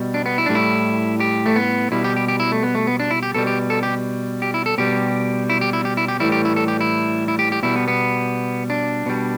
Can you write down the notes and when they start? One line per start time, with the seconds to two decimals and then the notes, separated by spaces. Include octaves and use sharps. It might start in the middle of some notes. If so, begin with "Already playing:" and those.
Already playing: B2 G3
0.14 D4
0.26 B3
0.38 E4
0.46 A2 G3 D4
0.55 E4
1.20 G4
1.46 A3
1.56 B3
1.92 B2 G3 E4
2.04 G4
2.16 G4
2.28 G4
2.40 E4
2.52 A3
2.63 B3
2.75 A3
2.87 B3
3.00 D4
3.11 E4
3.23 G4
3.35 B2 G3 A4
3.47 G4
3.70 A4
3.83 G4
4.42 G4
4.54 E4
4.66 A4
4.78 B2 G3 G4
5.50 E4
5.61 G4
5.73 E4
5.85 G4
5.97 E4
6.08 G4
6.20 A2 E3 G3 E4
6.32 G4
6.45 E4
6.56 A4
6.68 G4
6.81 E4
7.28 E4
7.39 G4
7.52 G4
7.63 B2 G3 E4
7.76 B3
7.88 B3
8.70 D4
9.06 B2 G3